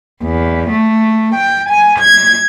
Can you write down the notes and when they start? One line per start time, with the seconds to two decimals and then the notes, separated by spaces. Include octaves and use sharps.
0.22 E2
0.69 A3
1.35 G5
1.69 G#5
2.00 G#6